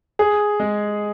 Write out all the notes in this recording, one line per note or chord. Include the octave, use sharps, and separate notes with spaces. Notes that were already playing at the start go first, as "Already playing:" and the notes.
G#4
G#3